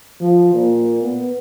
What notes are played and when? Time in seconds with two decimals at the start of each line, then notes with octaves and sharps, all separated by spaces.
0.21 F3
0.54 A#2
1.02 B3